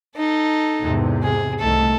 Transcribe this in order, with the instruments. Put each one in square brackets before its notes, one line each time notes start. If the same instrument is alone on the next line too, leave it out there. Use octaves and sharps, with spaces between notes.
[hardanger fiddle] D#4 A4
[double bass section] E2 G#2 C3
[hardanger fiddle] G#4
[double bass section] C2 D#3 A3 [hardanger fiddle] A4